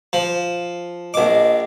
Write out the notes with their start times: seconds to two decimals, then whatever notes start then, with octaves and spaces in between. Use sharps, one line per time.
0.13 F3
1.14 A#1 D#5 D6